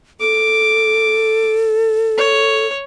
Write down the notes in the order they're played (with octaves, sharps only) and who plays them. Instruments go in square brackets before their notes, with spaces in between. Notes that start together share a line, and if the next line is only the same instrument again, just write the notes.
[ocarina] A4 [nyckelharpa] D6
[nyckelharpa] C#5